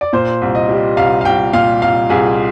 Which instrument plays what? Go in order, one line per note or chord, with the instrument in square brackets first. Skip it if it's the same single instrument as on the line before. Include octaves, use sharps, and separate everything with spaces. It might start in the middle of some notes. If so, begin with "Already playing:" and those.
[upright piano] D5
A#2 C5
C2
D#5
G3
C2 F5
F5
C2 G5
A#2 F5
C2 F5
C2 G#4